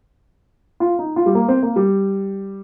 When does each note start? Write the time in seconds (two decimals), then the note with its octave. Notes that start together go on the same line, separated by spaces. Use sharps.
0.80 F4
0.99 D#4
1.16 F4
1.26 G3
1.35 A#3
1.48 C4
1.63 A#3
1.76 G3